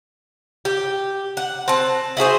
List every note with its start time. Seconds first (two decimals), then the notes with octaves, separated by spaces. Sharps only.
0.65 G4
1.37 F#5
1.68 C4 A5
2.17 E4 F#4 G#4 C5